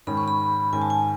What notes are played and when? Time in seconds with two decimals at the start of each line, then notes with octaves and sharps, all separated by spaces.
0.07 G#2 D#3 G#3 C#4 B5
0.17 C#6
0.28 B5
0.73 G#2 D#3 G#3 C#4 G#5
0.82 A5
0.90 G#5